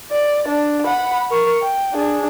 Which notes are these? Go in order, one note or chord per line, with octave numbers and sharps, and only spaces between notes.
D5
D4
F#5 B5
A#4 C#6
G5
D4 G#4